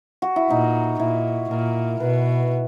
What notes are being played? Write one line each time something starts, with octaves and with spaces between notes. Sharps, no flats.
F#4
E4
A#2 D#4
A#2 E4
A#2 A#4
B2 B4